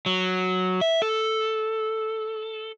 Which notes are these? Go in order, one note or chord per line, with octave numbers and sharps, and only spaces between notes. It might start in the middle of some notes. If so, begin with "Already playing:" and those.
F#3
E5
A4